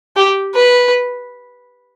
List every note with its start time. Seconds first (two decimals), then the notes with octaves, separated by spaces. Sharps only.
0.16 G4
0.55 B4